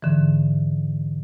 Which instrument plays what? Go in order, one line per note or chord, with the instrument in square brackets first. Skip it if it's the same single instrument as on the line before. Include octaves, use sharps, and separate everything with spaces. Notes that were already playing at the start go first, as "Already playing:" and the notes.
[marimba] G#2 D3 E3